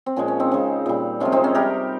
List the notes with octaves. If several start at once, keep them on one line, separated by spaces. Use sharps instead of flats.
C4
A#2 F3 G#3 C#4
C#4
C4 D#4
C#3 G#3
A#2 G3
C3 F3 G#3 C#4 F4
C4 D#4
C#4
C3 G3 G4 A#4